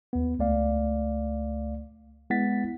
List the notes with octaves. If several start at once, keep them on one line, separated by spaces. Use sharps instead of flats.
D#2 B3
C#2 A3 D5 F5
G#3 B3 E4 F#5 A6 B6